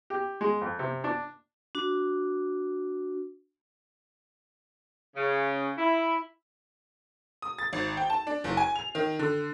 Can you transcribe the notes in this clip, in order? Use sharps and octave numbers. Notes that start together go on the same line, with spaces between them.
G4
G#3
F2
C3
D4
D4 F#4
C#3
E4
D#6
A6
G#1
G5
A5
D4
F#1
G#5
F7
D#3
D3